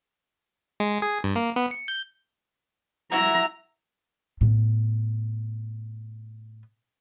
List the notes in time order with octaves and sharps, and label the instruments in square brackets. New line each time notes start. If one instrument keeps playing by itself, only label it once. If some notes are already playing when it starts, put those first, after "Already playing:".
[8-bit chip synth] G#3
G#4
G2
A#3
B3
C#7
G6
[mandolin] E4 F#4 E5 [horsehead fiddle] A#5
[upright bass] A2 B3